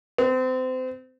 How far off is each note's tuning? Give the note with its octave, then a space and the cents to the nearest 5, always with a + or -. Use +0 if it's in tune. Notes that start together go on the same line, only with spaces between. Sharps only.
C4 -30